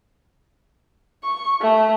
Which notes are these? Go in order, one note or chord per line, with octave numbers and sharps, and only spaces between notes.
C#6
A3